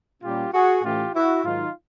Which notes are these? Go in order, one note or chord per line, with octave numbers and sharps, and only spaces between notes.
A#2 G3 A#3 C#4 F4 G4
F#4 G#4
A2 E3 A3 C#4 F4 G4
E4 F#4
G#2 D#3 F#3 D#4 F4